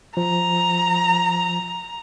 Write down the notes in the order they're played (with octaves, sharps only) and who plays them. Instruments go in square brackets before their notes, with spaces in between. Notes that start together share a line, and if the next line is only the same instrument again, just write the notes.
[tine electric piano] F3 [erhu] A#5